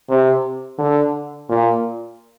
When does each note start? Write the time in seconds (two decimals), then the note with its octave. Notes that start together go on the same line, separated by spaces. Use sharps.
0.09 C3
0.78 D3
1.49 A#2